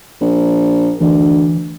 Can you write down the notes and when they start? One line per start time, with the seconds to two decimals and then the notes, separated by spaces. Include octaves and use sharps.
0.21 A#1
1.01 D2 E3